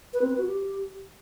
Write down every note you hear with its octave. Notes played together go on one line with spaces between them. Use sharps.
B4
C4
B4
F#4
G4